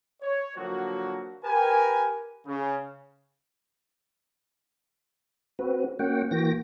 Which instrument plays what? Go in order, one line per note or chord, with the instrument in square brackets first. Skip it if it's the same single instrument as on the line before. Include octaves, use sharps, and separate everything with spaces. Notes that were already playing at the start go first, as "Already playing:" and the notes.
[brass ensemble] C#5
D3 F3 F#3 A#3 F#4
G4 A#4 B4 G#5
C#3
[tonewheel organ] C4 F#4 B4
A#3 C#4 F#4 F#5 G5
E3 A#3 F#4 G5 A#6